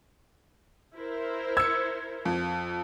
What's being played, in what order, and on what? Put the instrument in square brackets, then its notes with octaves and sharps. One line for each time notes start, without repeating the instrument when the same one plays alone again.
[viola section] E4 A#4 C5
[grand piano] E6 [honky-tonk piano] G#6 C#7
[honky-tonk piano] F2